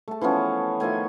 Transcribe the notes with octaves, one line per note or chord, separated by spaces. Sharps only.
A3 A5
E3 F3 B3 C#4
D#3 F3 A3 G#5